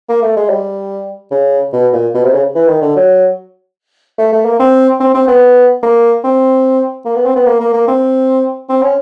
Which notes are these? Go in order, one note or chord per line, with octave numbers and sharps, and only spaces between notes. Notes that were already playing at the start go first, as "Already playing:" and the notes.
A#3
A3
G#3
G3
C#3
B2
A#2
B2
C3
C#3
E3
D#3
D3
F#3
A3
A3
A#3
C4
C4
C4
B3
A#3
C4
A#3
B3
C4
B3
A#3
A#3
A#3
C4
C4
C#4